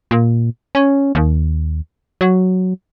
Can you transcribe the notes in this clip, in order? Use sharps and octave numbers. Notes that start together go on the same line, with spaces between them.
A#2
C#4
D#2
F#3